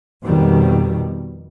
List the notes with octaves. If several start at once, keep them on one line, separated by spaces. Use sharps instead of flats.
F2 B2 D#3 G3